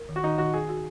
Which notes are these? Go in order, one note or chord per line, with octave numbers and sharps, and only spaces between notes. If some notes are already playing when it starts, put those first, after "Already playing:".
Already playing: A#4
D#3
F#4
D#3 D#4
D#3 F#4
F#4 G#4
F#4